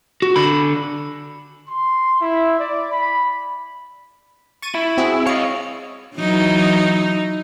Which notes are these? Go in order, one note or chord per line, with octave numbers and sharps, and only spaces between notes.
F#4
D3 B5
C6
E4
D5
B5
C#6 A6 D#7
E4
C4 F#4 G#4
C#5 D#5 F5 C#7
E3 F#3 D#4